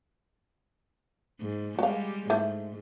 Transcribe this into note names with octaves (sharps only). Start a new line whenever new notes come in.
G#2
G3 G#3 F#4 F5
G#2 A3 E4